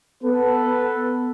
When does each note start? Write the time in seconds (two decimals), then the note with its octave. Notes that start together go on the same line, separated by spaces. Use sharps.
0.24 B3 A4 B4